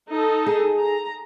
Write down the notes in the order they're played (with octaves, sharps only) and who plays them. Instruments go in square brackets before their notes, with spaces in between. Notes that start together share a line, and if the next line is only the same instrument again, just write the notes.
[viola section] D#4 A4
[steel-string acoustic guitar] G#4
[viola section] A#5